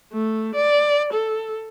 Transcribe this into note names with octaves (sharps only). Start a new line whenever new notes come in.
A3
D5
A4